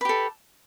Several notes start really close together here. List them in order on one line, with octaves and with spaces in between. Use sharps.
B4 G4 A4